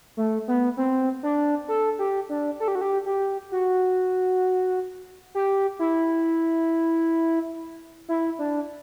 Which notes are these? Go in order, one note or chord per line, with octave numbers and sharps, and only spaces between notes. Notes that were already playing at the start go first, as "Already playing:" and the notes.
A3
B3
C4
D4
A4
G4
D4
A4
G4
F#4
G4
G4
F#4
G4
E4
E4
D4